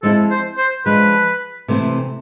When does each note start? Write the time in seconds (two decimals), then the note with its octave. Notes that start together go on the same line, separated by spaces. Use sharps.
0.03 F3 G#3 C4 E4 A4
0.31 C5
0.58 C5
0.86 F3 G#3 D4 B4
1.68 C3 E3 A3 C4 E4